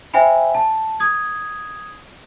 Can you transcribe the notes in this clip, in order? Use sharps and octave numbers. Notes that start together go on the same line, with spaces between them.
C5 E5 G5 G#5 B5
A5
D#6 G#6